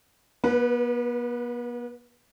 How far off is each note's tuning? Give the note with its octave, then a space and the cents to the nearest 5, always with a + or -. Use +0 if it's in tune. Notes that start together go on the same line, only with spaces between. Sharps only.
B3 -40 B4 +0